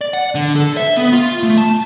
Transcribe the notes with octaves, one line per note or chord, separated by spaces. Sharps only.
D5
F#5
D3
A4
E5
B3
F4
A3
A5